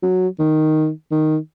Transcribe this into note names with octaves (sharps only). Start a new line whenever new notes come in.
F#3
D#3
D#3